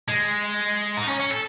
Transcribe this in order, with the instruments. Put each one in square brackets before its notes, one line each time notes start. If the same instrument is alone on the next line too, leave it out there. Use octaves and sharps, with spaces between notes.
[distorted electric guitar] G#3
D#4
C#4
C#4
A4